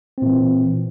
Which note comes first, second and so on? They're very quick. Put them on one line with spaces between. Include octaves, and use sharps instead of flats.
C4 A#2 E3